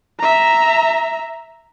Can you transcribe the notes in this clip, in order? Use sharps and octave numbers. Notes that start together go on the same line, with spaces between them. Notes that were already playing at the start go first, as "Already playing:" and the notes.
E5 A#5